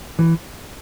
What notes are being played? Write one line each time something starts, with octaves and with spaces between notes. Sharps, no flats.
E3